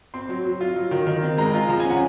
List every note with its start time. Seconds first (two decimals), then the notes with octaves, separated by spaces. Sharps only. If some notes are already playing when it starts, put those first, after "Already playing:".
0.14 C4 C6
0.29 F#3
0.45 F#3
0.61 F4
0.76 F#3
0.91 D#3
1.07 D#3
1.22 C4
1.38 G#3 A#5
1.54 F4
1.69 F3 A#5
1.80 G#5
1.84 C#4
1.90 F#5